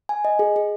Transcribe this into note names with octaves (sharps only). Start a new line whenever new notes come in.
G#5
D#5
G#4
G#4